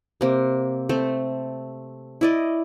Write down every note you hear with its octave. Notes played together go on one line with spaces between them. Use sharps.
C3 A#3
A3 C4
E4 D5 D#5